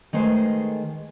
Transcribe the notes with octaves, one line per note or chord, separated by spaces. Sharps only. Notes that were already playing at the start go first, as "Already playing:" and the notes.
D#3 G#3 A3 G#4 B4 C5